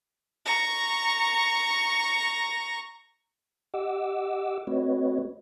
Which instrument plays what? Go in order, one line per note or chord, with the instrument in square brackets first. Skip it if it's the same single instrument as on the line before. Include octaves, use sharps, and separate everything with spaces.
[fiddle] A#5 C#6
[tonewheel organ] G4 D#5 F#5 D6 E6
A3 C4 F#4 B4 C#5 D#5